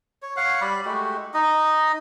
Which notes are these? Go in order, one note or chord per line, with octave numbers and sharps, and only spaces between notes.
C#5
C#5 F5 F#5
G3 D5 B5
G#3 A3 F#4 G4
D#4 D#5